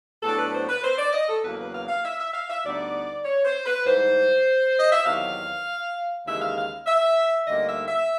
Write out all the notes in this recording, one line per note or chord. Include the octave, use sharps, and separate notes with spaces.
A2 F#3 B3 D4 A4
B4
C5
B4
C5
D5
D#5
A4
E2 C#3 F#3 A#3 B4
B4
F5
F5
E5
E5
F5
E5
D2 D3 G3 B3 D#4 D5
C#5
C5
B4
G#2 E3 G3 C5
D#5
E5
E2 C3 D#3 F#3 F5
D#2 C#3 E3 G#3 E5
F5
F5
E5
D2 D3 G3 A#3 D#4 D#5
E5
E5